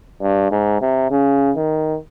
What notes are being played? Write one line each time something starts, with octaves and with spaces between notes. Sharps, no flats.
G2
G#2
C3
C#3
D#3